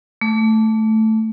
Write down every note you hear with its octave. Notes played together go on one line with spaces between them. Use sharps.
A3